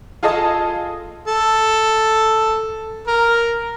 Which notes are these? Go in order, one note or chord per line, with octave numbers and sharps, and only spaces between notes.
F4 G#4 A4 D#5 A5 D#6
A4
A#4